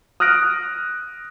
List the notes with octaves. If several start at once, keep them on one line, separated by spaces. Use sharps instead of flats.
D#6 F6 F#6 A#6 D7